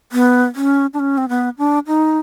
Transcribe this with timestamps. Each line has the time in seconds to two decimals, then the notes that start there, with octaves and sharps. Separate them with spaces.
0.12 B3
0.56 C#4
0.94 D4
1.00 C#4
1.18 C4
1.29 B3
1.58 D4
1.87 D#4